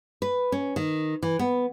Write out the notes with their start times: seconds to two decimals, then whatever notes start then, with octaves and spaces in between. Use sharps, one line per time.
0.22 B4
0.52 C#4
0.76 D#3
1.22 E3
1.39 B3